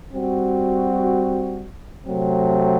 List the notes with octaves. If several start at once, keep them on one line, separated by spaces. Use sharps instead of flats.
G3 C4 F#4
C3 F#3 A3 C4